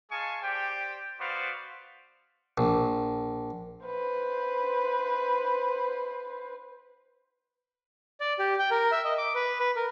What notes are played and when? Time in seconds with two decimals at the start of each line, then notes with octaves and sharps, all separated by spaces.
0.12 G#3 G#4 F5 G#5 A5 C#6
0.43 G4 C5 D5 G5
1.21 B3 F#4 B4 C5 D5 F5
2.58 A#1
3.85 B4 C5
8.20 D5
8.39 G4
8.59 G5
8.71 A#4
8.92 E5
9.05 D#5
9.18 D6
9.35 B4
9.60 B4
9.76 A#4